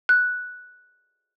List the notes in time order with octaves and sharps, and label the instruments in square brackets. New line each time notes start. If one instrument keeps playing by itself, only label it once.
[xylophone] F#6